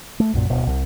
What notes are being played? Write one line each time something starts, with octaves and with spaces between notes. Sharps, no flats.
A3
B1 F#2 A#2
D1 B2
C2